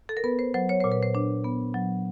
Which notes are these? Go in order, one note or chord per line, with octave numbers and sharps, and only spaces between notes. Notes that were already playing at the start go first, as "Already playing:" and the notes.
A4
A#4
B3 B4
C5
F#3 C5
C#5
A#2 C5
B4
C5
D4
B3
F#3